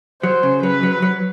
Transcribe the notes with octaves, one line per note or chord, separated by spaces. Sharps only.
F#3 C5
C#3
F#3 B4
F#3
F#3